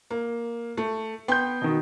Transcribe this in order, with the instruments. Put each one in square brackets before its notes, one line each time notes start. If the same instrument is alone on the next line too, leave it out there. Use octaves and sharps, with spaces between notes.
[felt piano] A#3
A3
[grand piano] B3 G6 [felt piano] G5 C6
[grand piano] B2 D#3